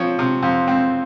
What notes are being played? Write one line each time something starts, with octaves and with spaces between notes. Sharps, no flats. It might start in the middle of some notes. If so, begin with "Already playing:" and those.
Already playing: F3 C4 C#5
C3
F2
C4